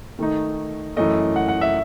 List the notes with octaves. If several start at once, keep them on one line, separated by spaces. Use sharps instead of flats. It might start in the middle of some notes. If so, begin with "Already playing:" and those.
D#3 A3 D#4
F#2 E3 A3 D#5
F#5
F#5
E5